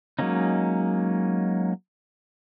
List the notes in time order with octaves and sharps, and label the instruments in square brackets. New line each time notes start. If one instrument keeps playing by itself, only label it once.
[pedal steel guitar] F#3 G#3 A#3 C#4 D#4